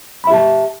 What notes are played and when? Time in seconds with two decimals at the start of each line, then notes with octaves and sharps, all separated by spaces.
0.24 B5
0.27 E5
0.30 G4
0.34 A5